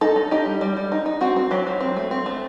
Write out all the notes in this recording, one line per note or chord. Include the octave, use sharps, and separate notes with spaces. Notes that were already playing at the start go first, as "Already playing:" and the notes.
D#4 A4
D#4
D#4 G4
G3
G3
G3
D#4
D#4
C4 F#4
C4
F#3 G4
F#3
C4
A3
C4
A3